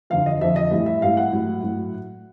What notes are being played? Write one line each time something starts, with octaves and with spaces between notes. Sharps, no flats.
F2 D3 F3 F5
D#5
F2 D3 F3 E5
D#5
A2 E3 G3 E5
E5
A2 E3 G3 F5
F#5
A2 F#3
A2 F#3